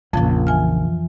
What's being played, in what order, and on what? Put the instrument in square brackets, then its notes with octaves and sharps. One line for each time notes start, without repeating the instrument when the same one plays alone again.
[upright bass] A#1 C#3 [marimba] F2 F3
[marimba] E3 G#5 F6